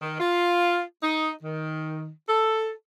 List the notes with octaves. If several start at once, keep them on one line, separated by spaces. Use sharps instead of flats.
D#3
F4
D#4
D#3
A4